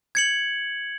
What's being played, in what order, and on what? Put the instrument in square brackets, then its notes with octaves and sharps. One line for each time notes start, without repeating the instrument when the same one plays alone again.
[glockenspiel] G#6 C#7 F#7